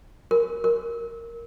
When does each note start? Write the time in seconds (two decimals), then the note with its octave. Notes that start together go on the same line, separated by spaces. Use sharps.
0.31 A#4
0.64 A#4